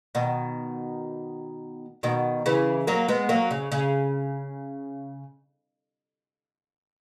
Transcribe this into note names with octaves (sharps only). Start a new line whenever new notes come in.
B2 D#3
B2 D#3
C#3 E3
F#3 A#3
G#3 B3
F#3 A#3
C#3
C#3